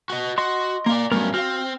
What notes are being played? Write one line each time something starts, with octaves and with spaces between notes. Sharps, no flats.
F#4 D#5
F#4 D#5 C6
A#3 A#4 D5 F5
G2 F#3 A3 B3 C#4 A#4
C4 F#4 C5 F5 F6